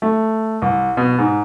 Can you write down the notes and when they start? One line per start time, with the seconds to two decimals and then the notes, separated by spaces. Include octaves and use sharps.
0.02 A3
0.62 C2
0.97 B2
1.19 G#2